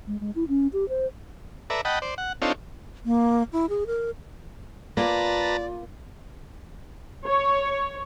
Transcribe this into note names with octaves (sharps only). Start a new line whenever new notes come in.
G#3
G#3
E4
C#4
G4
C5
A4 B4 D5 E5 A#5
D#5 F#5 G5 A5 B5
C5 D5
F#5
C4 D4 D#4 F4 A4 C#5
A#3
E4
G#4
A#4
A#3 F4 B4 D5 A5 A#5
C#5